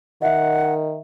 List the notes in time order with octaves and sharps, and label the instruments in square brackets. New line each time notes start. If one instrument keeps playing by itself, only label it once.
[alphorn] D#3 [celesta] D#5 E5 [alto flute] F#5